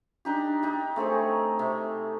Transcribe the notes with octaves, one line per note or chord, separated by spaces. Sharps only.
D4 D#4 G4
D#4 G4
A3 C4 G#4 C#5
C3